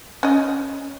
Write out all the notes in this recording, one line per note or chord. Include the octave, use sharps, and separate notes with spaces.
C#4 D#5